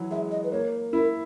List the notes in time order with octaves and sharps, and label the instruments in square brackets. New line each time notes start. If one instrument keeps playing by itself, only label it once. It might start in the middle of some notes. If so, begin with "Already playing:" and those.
Already playing: [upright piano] E3 F#3
[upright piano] G#3 [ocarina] E5
[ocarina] D#5
B4
[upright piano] A#3 [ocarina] C#5
[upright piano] E4 [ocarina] A#4